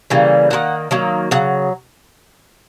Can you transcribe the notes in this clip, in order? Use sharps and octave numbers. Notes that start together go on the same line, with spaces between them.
C#3 E3 G3 A#3
D#3 F#3 A#3 F#5
D#3 F#3 A#3
C#3 F#3 F#5